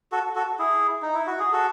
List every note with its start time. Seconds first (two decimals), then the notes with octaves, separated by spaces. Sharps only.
0.12 F#4 A4
0.36 F#4 A4
0.59 E4 G#4
1.02 D#4
1.14 E4
1.27 F#4
1.39 G#4
1.52 F#4 A4